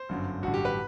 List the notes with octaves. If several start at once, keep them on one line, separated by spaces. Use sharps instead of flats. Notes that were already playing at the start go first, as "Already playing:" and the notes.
Already playing: C5
G1 F#2 D3
A1 G2 D3 F#4
G4
B4